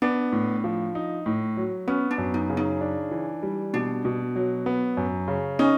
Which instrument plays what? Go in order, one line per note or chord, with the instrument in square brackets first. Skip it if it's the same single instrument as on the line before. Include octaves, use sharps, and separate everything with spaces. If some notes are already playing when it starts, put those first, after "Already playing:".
[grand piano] B3 [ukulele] D4
[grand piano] A2
F3
D#4
A2
F#3
[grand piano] B3 [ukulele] C#4
[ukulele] D4
[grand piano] F#2
[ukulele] D#4
[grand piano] C#3
[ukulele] D#4
[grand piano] D4
E3
G3
[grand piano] B2 [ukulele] D4
[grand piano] B2
F#3
B3
F#2
C#3
[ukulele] C#4 [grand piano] D#4